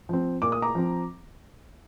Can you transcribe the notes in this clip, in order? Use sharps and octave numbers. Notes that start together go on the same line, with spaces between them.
F3 C4
A#2 D6
D#6
A#5 D6
F3 C4